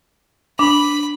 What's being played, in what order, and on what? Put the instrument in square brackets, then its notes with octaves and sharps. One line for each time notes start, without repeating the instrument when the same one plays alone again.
[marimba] D4 [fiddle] B5